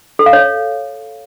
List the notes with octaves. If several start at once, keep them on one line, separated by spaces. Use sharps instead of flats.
A4
F5
C#5